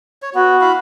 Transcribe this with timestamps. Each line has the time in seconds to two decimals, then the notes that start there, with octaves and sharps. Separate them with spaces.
0.22 C#5
0.35 B3 F#4
0.61 E4 F5 B5